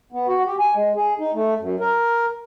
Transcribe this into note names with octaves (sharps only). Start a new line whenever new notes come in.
B3
F#4
G4
G#5
G#3
G#4
D#4
A3
F#2
A#4